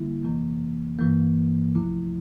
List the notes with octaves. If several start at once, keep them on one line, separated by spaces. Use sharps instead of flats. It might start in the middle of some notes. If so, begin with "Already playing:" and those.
Already playing: D3 G3 A#3 E4
F2 C3 E3 A#3
G2 E3 A#3
C2 C3 F3 A3 E4